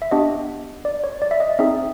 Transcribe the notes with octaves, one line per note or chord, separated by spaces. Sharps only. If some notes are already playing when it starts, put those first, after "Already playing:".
E5
B3 D4 G4 D#5
D5
C#5
D5
E5
D#5
C4 D#4 G#4 E5